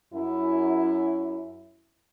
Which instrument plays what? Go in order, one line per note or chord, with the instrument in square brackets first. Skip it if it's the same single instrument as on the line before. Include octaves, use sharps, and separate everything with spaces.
[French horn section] F#2 E4